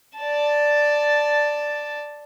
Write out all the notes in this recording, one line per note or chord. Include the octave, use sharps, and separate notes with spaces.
D5 A5